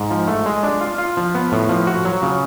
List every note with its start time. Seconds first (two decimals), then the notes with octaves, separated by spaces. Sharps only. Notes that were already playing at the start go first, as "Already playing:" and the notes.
Already playing: G#2
0.11 F3
0.28 A3
0.46 G#3
0.63 D4
0.81 F4
0.98 F4
1.17 F3
1.35 B3
1.52 A2
1.69 F3
1.87 F#4
2.05 F#3
2.22 C#3